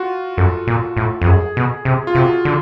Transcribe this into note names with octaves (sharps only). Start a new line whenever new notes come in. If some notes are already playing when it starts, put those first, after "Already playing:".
Already playing: F4 F#4
F#2 A4
A#2
A2
F2
F#2 G#4
B2
C3
F4
C3 F#4
D3